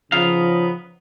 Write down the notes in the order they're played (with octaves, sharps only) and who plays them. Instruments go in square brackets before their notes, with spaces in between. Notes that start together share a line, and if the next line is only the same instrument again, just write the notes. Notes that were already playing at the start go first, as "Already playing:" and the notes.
[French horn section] C#3 F3 [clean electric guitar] B3 D#4 F5